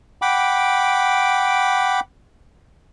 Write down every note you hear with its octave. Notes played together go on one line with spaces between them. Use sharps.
F#5 G5 B5 D6